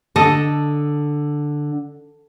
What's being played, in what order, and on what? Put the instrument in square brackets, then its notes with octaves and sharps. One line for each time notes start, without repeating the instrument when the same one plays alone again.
[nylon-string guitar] D3 [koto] A4 D#5